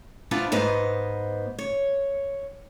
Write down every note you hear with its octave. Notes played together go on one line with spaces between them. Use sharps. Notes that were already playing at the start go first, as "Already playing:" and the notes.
B3 D4 E4 F4 C5
G#2 B3 C5 D#5
C#5